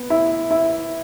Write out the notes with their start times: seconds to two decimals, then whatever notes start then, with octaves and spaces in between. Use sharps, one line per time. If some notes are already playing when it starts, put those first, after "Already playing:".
Already playing: B3
0.10 E4
0.51 E4